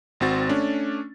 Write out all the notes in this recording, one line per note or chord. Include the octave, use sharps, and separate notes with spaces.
G#1 C4 F#4 A6
A3 C#4 D4